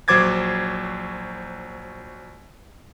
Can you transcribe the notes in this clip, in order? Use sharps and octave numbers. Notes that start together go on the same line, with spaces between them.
A#1 F#3 C5 D6 G#6 A6